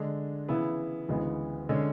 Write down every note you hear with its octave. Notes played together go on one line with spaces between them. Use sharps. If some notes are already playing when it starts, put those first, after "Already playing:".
Already playing: D3 G#3 D4
C#3 E3 B3 E4
D2 C#3 E3 G#3 B3
D3 G#3 C#4